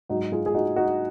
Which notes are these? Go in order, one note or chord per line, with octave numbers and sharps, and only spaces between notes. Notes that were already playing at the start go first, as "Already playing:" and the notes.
G#2 F#3 D#4 F#4
F4 G#4
G#4
D#4 F#4
D#4 F#4